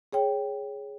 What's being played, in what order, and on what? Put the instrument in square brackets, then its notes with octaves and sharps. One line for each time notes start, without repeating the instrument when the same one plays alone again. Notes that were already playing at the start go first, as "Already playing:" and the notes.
[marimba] G#4 C#5 G5